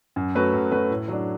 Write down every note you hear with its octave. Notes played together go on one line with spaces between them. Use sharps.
F#2
F#3 A3 F#4 B4
F#2
F#3 A3 F#4 B4
A2
F#3 D4